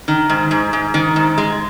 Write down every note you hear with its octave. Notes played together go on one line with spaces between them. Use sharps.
D#3
G#2
G#2
G#2
D#3
G#2
G#3